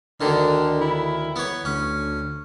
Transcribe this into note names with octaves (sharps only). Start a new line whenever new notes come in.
D2 D3 D#3
E4
B3 C#5
D2 C#4